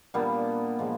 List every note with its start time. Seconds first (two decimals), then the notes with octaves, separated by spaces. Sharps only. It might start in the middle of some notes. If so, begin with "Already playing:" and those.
0.14 A#2 G3 B3 D4
0.79 A#2 F3 G#3